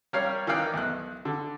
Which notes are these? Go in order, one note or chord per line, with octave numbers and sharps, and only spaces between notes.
G3 A#4 C#5 F5
D#3 E3 D5 F5 G5 F#6
B1 F#6
D3